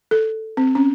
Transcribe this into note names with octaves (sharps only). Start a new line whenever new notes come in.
A4
C4
C#4